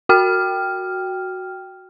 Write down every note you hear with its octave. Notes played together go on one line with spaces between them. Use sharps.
F#4 G5 F6